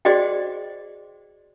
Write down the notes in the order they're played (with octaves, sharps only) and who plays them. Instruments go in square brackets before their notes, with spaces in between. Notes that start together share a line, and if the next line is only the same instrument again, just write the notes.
[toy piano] F#4 G#4 C5 D5 D#5 G5